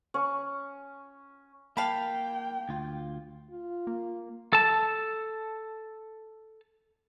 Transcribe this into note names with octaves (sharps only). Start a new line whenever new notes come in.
C#4
A#3 F5 G5 A5 B5
D2 F4
F4
A#3
A4 A5